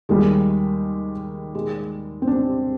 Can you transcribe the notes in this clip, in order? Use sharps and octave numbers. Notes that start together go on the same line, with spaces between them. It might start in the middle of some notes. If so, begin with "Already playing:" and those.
D#2 D#3 G3 G#3
G#3
C4
D4